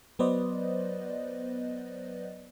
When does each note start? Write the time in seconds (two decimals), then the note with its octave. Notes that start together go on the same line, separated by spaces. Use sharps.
0.19 F#3 B3 B4 C5 D5 D#5